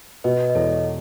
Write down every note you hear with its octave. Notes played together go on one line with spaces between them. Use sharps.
B2 B4 D#5
D#5
E2 A4 C#5